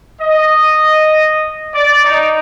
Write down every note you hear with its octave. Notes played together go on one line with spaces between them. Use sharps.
D#5
D5
D#4